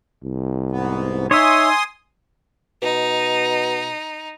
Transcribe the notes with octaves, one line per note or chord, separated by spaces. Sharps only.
C2
G#2 B3
D#4 C#5 E5 G#5 C6 D#6
B2 D#4